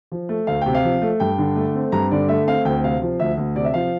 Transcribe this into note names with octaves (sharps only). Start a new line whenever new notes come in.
F3
A3
D2 F5
C3 G5
F5
F3
A3
G2 G5
D3
A3
C4
G2 A#5
D3 D5
A3 E5
C4 F5
D2 G5
C3 F5
F3
D2 E5
D2
C3 D5
E5
F3 F5